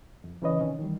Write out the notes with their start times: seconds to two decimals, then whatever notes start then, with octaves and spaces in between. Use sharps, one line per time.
0.24 F2
0.42 C#3 E3 C#4 B4 C#5 D#5
0.59 C3 D#3 C#4
0.79 D#3 E3 G3